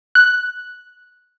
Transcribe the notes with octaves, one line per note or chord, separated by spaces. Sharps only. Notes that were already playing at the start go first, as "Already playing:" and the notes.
F#6